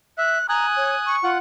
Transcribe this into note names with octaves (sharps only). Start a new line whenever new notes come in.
E5 F#6
G#5 A#5 D#6 F#6
C#5
C#6
F4 F#5 F#6